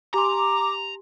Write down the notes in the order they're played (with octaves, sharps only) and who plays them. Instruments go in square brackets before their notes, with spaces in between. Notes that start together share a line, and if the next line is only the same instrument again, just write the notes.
[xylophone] G4 G#5 C6 [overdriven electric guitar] A#5 [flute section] D6